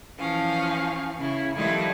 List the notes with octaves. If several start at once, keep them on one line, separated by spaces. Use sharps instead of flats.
E3 F3 C#4 F5
C#3 C#4 E4
D#3 F3 G3 A3 D#4 E4